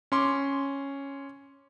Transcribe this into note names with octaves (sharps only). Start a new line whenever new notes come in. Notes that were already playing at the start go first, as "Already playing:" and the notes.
C#4 C6 D6